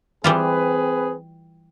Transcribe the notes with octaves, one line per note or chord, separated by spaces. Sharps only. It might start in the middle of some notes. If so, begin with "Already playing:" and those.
E3 G3 C4 F4 G#4 B4